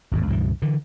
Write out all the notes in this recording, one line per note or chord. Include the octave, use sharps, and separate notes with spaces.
G#1 E2 A2
C#2 G2 B2 E3
D3 E3